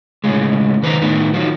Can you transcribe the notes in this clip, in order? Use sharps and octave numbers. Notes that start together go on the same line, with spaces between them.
A2 C#3 G#3
D#3 B4 C5 D5 A#5
A2 D#3 B3
D#3 F3 F#3